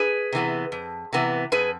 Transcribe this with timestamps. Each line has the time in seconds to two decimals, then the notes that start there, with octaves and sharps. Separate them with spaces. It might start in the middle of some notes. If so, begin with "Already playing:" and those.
Already playing: G#4 B4
0.32 C3 E3 B3
0.72 F2
1.13 C3 E3 B3
1.52 F2 G#4 B4